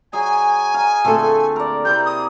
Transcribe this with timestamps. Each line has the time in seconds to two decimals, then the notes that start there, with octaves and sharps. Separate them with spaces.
0.13 F#3 G#4 D#5 G#5
0.74 F5 A#5
1.05 D2 A#2 A3 C4 A4
1.56 A#4 D5
1.85 C3 A#3 E4 G6
2.06 D#6